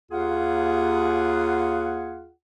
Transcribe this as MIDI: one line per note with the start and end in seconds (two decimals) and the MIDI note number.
0.11 2.31 39
0.11 2.31 65
0.11 2.31 68
0.11 2.31 78